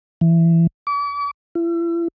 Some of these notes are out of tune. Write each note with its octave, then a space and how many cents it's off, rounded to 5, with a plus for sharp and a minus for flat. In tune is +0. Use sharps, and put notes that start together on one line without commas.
E3 +15
D6 -40
E4 +40